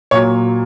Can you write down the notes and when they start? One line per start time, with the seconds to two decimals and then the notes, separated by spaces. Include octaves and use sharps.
0.11 A#2 F#3 C#5